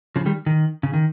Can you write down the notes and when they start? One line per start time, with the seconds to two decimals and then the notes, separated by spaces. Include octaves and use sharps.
0.16 C#3 F3
0.26 D#3 G3
0.46 D#3
0.83 C#3
0.94 D#3